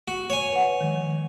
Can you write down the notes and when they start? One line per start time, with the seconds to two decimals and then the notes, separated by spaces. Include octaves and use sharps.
0.08 F#4
0.30 C#5 G#5
0.52 B4 F#5
0.81 D#3 F3 G#3